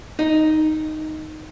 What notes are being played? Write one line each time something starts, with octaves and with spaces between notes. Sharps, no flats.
D#4